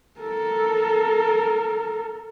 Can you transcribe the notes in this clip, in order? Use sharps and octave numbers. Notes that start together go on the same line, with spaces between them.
A4 A#4